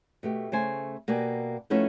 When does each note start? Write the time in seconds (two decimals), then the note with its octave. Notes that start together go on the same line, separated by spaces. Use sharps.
0.23 B2 A3 G4
0.52 C#3 A3 C5 G#5
1.08 B2 A#3 G4 D5 G#5
1.70 F3 A3 B3 C#4 D#4 E4